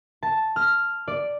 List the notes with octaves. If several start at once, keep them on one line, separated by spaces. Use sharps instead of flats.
A5
F6
D5